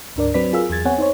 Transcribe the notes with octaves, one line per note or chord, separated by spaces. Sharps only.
D2 G#2 D4 A#4 D5
F#3 C4 B4 D5 B6
F4 G#4 A#4 F5 E6
E2 F#3 G#4 G#6 A6
B3 C4 C#5 F#5 G#5
D#4 C5 C#5